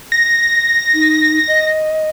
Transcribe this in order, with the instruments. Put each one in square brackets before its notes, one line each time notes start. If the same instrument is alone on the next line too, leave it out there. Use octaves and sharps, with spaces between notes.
[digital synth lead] A#6
[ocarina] D#4
D#5